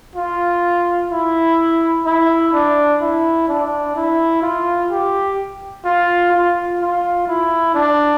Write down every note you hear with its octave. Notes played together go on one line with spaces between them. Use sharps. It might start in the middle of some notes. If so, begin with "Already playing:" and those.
F4
E4
E4
D4
E4
D4
E4
F4
G4
F4
F4
F4
E4
D4